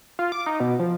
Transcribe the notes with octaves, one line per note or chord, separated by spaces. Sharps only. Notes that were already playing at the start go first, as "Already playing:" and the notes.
F4
D6
D#4
B2
F3